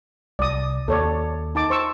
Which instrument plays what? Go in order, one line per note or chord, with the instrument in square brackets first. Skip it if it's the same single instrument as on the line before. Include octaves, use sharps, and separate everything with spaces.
[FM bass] C2 [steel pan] D5 D#6
[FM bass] D#2 [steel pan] A4 C#5 D5
[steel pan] D#4 A5 D6
C5 C#6 E6